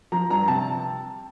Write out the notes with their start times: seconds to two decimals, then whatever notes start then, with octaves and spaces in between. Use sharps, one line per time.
0.12 F3 A#5
0.30 G2 A#5
0.48 C3 A5